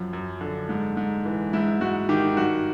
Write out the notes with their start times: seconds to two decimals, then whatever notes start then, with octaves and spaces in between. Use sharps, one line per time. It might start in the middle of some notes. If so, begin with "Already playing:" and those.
Already playing: F#2 F3
0.13 F#2
0.41 D3
0.69 G#2
0.97 G#2
1.25 E3
1.53 G#2 E4
1.81 G#2 F#4
2.09 D#3 G4
2.37 G2 F#4